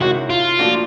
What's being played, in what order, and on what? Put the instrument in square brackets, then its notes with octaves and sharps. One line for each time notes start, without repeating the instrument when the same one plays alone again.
[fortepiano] C3 D#3 G#3 C#4 E4 [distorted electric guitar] F#4
[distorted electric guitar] F4
[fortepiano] A#2 F3 A3 D4 F#4